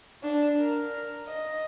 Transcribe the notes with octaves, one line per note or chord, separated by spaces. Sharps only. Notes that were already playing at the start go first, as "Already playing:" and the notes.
D4
A#4
D#5